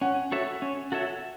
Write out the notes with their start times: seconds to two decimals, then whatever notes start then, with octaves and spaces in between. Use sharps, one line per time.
0.01 C#4 F#5
0.32 F#4 A4 C#5 E5
0.62 C#4
0.92 F#4 A4 C#5 E5